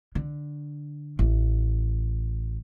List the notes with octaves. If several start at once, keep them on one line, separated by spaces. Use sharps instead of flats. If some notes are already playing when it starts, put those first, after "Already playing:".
D3
A1